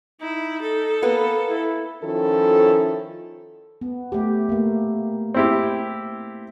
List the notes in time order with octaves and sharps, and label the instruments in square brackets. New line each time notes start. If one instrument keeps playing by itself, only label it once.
[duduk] D#4 [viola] E4
[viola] A4
[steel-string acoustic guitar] A#3 B3 B4
[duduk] E4
[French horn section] D#3 F3 C#4 E4 A4
[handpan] B3
A3 G4
A3 A#3
[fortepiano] C4 E4 G4